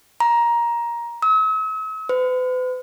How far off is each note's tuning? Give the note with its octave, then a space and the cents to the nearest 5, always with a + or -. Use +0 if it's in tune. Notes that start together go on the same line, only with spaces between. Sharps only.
A#5 +15
E6 -45
B4 +45